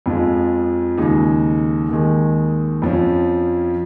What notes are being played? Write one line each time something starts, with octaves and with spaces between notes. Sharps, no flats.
F2 F3 G#3
D#2 C#3 G#3 D#4
D#2 D#3 G#3
F2 F3 C#4